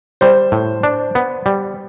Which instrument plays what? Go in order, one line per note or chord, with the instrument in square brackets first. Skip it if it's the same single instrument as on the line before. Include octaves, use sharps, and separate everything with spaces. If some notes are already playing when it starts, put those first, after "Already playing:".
[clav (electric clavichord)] G3 [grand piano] C5
[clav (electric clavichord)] A2
D4
B3
G3